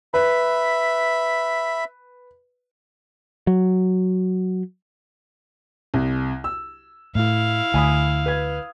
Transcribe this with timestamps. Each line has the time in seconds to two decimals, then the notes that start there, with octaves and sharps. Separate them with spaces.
0.14 B4 E5 B5
3.47 F#3
5.94 C2
6.44 E6
7.15 A2 E4 F5
7.74 D2 G#5 B5 D#6
8.26 B4 G#6